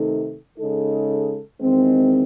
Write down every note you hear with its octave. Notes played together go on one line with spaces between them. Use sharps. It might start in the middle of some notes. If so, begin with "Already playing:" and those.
Already playing: C3 D#3 A3 D#4 A4
C#3 G#3 D#4 A4
E2 D#3 G#3 C4